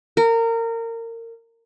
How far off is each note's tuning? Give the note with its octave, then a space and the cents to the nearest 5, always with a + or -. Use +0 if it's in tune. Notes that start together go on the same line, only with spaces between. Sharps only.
A#4 -25